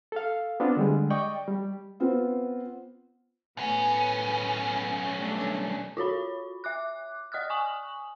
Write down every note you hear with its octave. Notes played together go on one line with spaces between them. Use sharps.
A4 F5
B3 C4 D4 F4
D3 G3 G#3
D5 D#5 G5 C#6
G3
B3 C4 F4
B1 A2 B3 C#4
G3 A3 D4
F4 F#4 C#5 B5
E5 D6 F#6
D5 D#5 D#6 F6 F#6
G#5 C#6 D#6 F#7